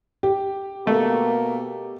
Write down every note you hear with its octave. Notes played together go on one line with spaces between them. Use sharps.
G4
B2 A3 A#3